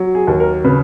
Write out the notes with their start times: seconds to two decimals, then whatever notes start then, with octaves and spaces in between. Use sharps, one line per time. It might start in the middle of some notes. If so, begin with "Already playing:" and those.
Already playing: F#3
0.15 G#4
0.27 D#2
0.40 A#4
0.64 C#3 B4